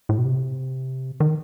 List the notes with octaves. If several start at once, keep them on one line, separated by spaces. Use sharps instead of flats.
A2
B2
C3
D#3